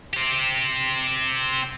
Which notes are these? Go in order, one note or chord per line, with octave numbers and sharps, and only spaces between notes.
C4 G4